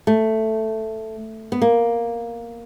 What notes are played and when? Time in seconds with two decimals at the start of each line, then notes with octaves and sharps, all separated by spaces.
0.07 A3
1.52 B3
1.62 A#3